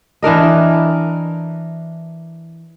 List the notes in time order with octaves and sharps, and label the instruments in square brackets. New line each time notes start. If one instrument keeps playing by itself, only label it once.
[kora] E3 D4 A#4 D#5